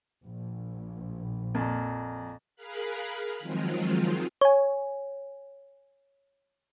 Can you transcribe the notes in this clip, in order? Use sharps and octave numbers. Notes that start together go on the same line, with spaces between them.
A#1
F2 A#2
G#4 A#4 F5 B5 F#6
D#3 F3 F#3 G#3 C4 F4
C#5 G#5